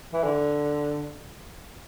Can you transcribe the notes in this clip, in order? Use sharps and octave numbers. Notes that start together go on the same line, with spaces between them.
E3
D3